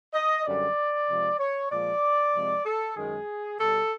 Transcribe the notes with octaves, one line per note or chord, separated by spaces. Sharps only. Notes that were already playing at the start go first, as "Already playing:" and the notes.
D#5
F#2 D3 G3 D5
C3 F3 G#3
C#5
A#2 F3 G#3 D5
C3 F3 G#3
A4
F#2 D#3 G#3 G#4
B2 G3 A4